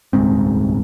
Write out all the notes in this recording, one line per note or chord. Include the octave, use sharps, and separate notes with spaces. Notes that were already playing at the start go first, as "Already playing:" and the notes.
D#1 C#2 G#2 C4